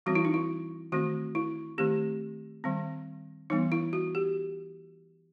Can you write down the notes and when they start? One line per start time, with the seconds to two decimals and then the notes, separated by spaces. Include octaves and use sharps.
0.06 E3 G3 C4 F#4
0.15 E4
0.25 D#4
0.34 E4
0.92 D#3 A3 C4 F#4
1.35 E4
1.78 D#3 A3 C4 G4
2.64 D#3 G3 C4
3.50 E3 G3 B3 D#4
3.72 E4
3.93 F#4
4.15 G4